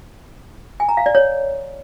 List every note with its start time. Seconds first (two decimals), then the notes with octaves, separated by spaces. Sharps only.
0.80 G#5
0.89 A#5
0.97 F5
1.06 D5
1.15 C#5